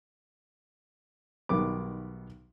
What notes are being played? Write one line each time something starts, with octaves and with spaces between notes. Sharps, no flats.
B1 G2 D#3 B3 D6